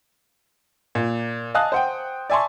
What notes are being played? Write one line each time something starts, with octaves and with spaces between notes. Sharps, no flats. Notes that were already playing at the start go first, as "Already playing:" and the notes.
A#2
D#5 F5 G#5 A5 D#6 F#6
C5 F#5 G5
D5 E5 G#5 A5 C6 C#6